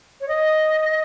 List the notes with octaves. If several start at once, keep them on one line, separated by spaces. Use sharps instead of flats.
C#5
D#5